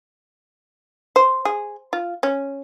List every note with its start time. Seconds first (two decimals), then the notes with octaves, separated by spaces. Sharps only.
1.16 C5
1.45 G#4
1.93 F4
2.23 C#4